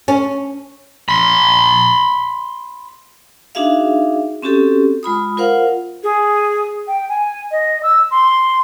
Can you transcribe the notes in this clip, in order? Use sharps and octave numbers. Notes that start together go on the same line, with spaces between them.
C#4
B5 C6
D4 D#4 F#4 G#4 E5 F5
C4 C#4 F#4 G4 A4
G#3 F4 B5 D#6
F4 A#4 C5 F5 F#5
G#4
G5
G#5
D#5
E6
C6